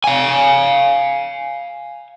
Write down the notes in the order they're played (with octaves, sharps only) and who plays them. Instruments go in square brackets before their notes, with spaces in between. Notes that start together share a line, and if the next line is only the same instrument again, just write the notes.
[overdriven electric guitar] F5 G#5